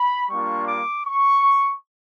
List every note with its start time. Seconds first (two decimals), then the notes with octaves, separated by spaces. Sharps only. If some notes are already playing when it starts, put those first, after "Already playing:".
Already playing: B5
0.30 G3 A#3 D4 F4 C#6
0.68 D6
1.06 C#6